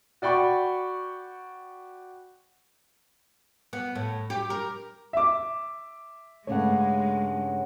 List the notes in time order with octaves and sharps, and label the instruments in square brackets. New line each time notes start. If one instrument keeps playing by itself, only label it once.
[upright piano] F#4 D5 G5 B5 C#6
[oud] B3
A2
G4
A#4
[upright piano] E5 D6
[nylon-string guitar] G2 C#3 A3 [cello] G#3 [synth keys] C#5 F#5